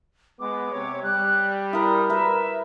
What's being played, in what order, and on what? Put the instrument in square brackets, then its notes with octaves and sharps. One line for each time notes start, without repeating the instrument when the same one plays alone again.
[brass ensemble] G#3 B3 [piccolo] D6
[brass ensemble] C3 C#5
[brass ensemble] G3 [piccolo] F#6
[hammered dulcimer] E4 A#4 [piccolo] D#6
[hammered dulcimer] A#4 B4 [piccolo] E5